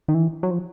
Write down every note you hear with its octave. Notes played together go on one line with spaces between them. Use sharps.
D#3
E3
F#3
F3